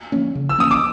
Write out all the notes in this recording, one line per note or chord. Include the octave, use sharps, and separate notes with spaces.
F3 A#3 C#4
C#3
E6
F3 A#3 C#4 D#6
D6